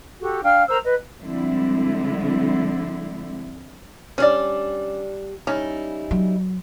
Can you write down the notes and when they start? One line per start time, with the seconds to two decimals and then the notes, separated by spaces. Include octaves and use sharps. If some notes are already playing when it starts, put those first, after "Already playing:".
0.21 F#4 G4 A4
0.43 D4 F5 G5 F6
0.69 A#4 C5 A#5 E6
0.84 B4 D#5
1.20 D3 F3 G3 G#3 C4 E4
4.18 G3 C#4 D4 D5
5.47 G3 C#4 D#4 E4
6.11 F#3